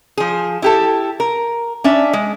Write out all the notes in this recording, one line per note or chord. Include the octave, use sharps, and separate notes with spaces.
F3 G#4
E4 G4 A4
A#4
C#4 D4 E5
G#3